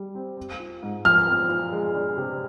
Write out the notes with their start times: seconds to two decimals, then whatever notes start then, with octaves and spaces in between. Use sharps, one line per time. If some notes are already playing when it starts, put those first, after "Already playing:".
Already playing: G3
0.15 C4
0.37 C4
0.60 F4
0.83 G#2
1.05 F3 F6
1.27 C4
1.49 F4
1.72 G#3
1.94 D4
2.17 C3